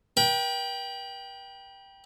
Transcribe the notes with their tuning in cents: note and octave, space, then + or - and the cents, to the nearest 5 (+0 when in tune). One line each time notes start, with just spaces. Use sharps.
B4 -40 G5 +0